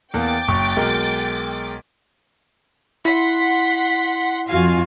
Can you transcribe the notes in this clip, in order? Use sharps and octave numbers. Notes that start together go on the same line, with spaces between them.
E2 A#3 G5 D6 A6
F#1 C#6
B1 G#3 A#4
E4 F#5 C6 B6
F2 F4 F#4 F5 G#5